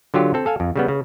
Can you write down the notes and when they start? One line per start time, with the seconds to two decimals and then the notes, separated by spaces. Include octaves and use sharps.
0.14 D3 F#3 F4 G4
0.34 C4 A4
0.46 A4 F5 G#5
0.60 F2
0.76 C#3 G3 B3
0.88 C#3